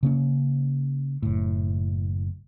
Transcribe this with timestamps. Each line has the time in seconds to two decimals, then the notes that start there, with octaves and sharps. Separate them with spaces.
0.03 C#3 A#3 C#4
1.22 F#1 A2